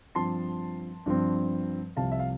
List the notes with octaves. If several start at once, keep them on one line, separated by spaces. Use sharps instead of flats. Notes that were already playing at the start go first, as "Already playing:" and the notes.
G2 F3 C4 A5 C6
G2 F3 C4
C2 C3 F3 F5 A5
E5
F5